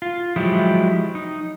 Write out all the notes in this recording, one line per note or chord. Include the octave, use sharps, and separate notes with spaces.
F4
F3 F#3 G#3 E4 G4
D#4